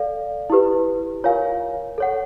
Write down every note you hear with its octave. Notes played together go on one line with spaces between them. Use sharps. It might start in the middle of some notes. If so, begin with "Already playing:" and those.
Already playing: A4 D5 F5
E4 G4 B4
F4 A#4 C#5 F5 G#5
A4 C#5 F#5